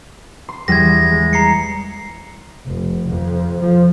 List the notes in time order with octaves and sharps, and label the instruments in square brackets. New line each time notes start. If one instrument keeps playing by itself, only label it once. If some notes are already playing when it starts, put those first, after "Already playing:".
[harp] C6
[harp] E2 G3 [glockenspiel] G#6 A#6
[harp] G#3
[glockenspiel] A#5 C7 C#7
[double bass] F1
F2
F3